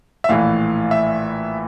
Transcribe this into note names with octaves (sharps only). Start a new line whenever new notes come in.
E5
A#1 A2 E3 F5
E5